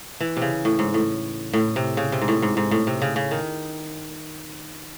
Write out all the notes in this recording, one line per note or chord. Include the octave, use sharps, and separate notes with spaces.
E3
C3
C#3
A2
G#2
A2
A2
C3
C#3
C3
G#2
A2
G#2
G#2
A2
C3
C#3
C#3
D#3